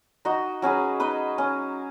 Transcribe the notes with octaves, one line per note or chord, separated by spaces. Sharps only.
D#4 F#4 D#5
F#3 C#4 G#4 B4
D#4 B4 D#5
C#4